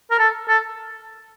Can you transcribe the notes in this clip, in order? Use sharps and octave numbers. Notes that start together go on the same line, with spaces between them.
A#4
A4
A4